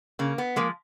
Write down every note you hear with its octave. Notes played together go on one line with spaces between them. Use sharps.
C#3 A#3
B3
F3 G#3 A#3